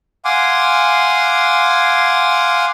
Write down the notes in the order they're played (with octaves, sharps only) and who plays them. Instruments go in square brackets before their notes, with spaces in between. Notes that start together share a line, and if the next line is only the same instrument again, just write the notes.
[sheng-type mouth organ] F5 F#5 G#5 C6 D6